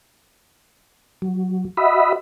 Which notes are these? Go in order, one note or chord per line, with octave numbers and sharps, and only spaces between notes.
F#3
F#4 D#5 E5 B5